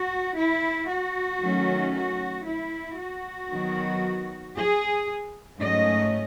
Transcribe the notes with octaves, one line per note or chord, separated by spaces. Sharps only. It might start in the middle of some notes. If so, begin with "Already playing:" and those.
Already playing: F#4
E4
F#4
D#3 F#3 A3 C#4
F#4
E4
F#4
D#3 F#3 B3
G#4
G#2 F#3 A3 C#4 D#5